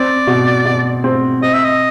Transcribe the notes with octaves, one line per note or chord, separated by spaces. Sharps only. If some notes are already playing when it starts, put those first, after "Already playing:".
Already playing: C4 D5
B2
B2
C4
C4 D#5
E5
D#5